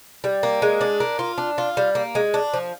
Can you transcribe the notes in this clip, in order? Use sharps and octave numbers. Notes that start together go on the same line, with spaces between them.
G3
A#3
G#3
D4
A#3
F4
D4
F4
G3
A#3
G#3
D4
F3